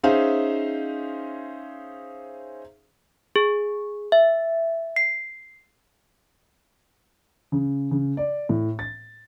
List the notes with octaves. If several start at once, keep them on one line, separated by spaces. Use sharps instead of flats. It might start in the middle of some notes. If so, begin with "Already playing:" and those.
C#4 D#4 G#4 C5 E5 F5
G#4
E5
C7
C#3
C#3
D5
A2
A6